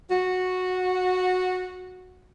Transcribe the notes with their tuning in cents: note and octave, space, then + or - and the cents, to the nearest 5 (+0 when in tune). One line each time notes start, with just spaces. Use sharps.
F#4 -10